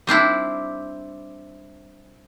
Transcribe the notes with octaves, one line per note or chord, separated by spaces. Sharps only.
G3 C4 D4 E4